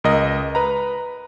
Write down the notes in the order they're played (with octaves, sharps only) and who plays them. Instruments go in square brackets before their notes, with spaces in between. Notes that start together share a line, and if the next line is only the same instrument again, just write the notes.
[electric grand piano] C#2 A#4 D#5
B4 A#5